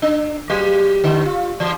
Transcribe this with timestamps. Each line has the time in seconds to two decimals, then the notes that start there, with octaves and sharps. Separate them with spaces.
0.02 D4
0.50 F#3 G4
1.04 D3
1.25 F4
1.60 E3